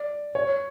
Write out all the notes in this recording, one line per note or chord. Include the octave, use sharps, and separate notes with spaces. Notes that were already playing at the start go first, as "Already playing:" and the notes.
Already playing: D5
C#5